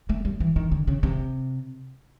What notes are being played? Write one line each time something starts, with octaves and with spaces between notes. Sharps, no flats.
A3
G3
E3
D#3
D3
C#3
C3